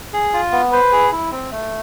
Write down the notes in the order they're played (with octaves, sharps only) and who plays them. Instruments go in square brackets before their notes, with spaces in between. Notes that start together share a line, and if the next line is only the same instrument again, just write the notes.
[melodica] G#4
F4
B3
[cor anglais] B4 [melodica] C5
[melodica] G#4
E4
C4
A3